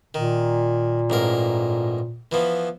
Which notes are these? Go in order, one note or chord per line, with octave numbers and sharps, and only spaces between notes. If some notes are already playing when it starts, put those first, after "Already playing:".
A#2 D#3
A1 G#2 A#4
E3 F3 B3